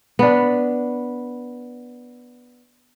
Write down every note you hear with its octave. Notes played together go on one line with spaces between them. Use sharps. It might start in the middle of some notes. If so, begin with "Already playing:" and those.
B3 D4